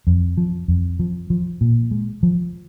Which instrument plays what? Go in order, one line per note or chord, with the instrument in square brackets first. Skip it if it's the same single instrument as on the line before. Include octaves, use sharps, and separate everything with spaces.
[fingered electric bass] F2
F3
F2
F3
F3
A#2
G#3
F3